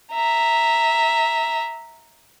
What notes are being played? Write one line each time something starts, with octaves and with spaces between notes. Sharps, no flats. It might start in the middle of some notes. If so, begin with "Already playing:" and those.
E5 A#5